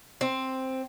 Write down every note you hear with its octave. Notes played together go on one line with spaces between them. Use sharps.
C4